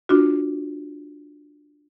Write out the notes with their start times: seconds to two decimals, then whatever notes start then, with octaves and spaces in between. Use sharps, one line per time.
0.09 D4 F4 F#4